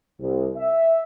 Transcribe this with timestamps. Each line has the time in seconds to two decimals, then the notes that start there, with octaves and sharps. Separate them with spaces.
0.20 C2
0.57 E5